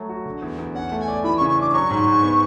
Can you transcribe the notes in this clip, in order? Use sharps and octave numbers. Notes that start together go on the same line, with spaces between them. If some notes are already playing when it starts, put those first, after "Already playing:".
Already playing: F#3 A3
F#4
D3
E2
E2
C#4 F#5
A3
G#5
D5
E3 B5
C#6
C#3
C#6
D4 D6
D6
F#3 C#6
G#2
G#2
B3